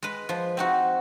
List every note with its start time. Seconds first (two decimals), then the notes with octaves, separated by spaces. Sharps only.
0.03 G#3 B4
0.29 F3
0.57 C4 D#4 F#4